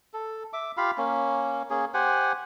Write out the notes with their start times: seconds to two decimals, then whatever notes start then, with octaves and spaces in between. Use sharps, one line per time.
0.14 A4
0.53 E5 D6
0.77 F4 G4 F5 B5
0.98 A#3 C#4
1.70 A#3 C#4 G#4
1.94 G4 C5 F#5 G#5